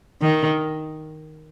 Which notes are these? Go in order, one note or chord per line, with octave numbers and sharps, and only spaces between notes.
D#3